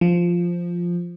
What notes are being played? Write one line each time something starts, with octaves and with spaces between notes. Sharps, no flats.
F3